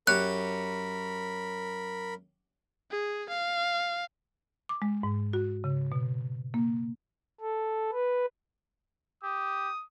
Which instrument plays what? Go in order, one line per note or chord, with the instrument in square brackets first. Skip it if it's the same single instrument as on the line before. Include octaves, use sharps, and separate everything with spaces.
[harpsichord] F#2 G4 C#5 [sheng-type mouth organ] A#4 B5 [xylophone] F#6
[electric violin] G#4
F5
[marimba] D6
G#3
G#2
F#4
C#3
B2
A#3
[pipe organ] A4
B4
[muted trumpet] G4 [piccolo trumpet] D#6